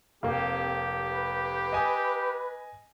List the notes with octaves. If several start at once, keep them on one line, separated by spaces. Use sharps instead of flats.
F1 A#3 C4 G4
B4
D#5 G#5 D#6